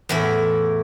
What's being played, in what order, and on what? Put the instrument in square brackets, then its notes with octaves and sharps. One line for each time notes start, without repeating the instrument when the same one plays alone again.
[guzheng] E2 A2 E4